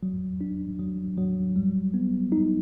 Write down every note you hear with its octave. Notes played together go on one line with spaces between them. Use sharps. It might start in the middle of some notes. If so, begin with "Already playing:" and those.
F#3
D4
F#3
F#3
G3
B3
D#4